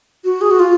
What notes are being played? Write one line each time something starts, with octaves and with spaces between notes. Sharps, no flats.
F#4
G#4
F#4
F4